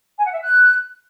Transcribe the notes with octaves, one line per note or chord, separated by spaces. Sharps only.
G#5
F#5
E5
F#6